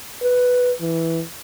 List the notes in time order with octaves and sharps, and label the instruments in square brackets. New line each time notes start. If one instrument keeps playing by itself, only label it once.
[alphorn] B4
E3